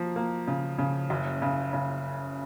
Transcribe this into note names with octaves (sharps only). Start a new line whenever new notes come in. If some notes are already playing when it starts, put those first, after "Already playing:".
Already playing: F3 A#3
A#3
C#3
C#3
F#1
C#3
C#3